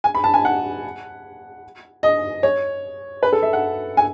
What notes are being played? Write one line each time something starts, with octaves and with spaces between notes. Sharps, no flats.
G#5
B5
A5
G#5
F#5
D#5
C#5
B4
A4
E5
F#5
G#5